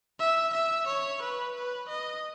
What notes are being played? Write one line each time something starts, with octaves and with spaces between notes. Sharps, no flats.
E5
E5
C#5
B4
B4
D#5